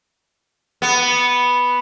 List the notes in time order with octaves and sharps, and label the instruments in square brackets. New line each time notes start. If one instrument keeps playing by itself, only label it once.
[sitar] B3